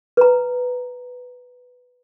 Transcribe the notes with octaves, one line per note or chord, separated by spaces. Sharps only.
B4 A#5